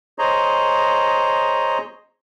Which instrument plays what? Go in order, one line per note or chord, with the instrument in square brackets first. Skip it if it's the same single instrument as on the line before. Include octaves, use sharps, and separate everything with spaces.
[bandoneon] G#4 C5 C#5 D#5 A#5